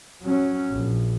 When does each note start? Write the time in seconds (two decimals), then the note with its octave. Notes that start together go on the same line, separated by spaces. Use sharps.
0.22 F#3 C#4
0.71 A#1